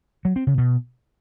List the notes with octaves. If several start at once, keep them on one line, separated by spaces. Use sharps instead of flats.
F#3
C4
C#3
B2